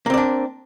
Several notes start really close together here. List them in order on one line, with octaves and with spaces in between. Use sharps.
A#3 C4 D5 D4